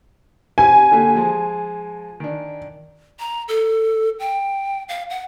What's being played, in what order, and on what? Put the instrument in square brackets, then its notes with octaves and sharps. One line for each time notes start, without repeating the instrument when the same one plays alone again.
[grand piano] C4 G4 [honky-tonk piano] G#5
[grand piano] D3 A#3 G4
F3 G#3
D#3 D4
[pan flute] A#5
A4
G5
F5
F#5